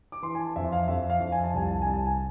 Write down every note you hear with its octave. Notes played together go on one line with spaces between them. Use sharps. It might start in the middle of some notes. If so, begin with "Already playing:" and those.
D6
E3 C6
G#5
A5
F2 E5
F5
F2 E5
F5
F2
G#5
A5
C2 G#5
A5
C2 G#5
A5
G#5